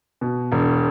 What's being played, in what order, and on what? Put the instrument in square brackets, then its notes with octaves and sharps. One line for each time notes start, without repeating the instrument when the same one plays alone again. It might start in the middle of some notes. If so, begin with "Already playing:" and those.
[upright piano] B2
E1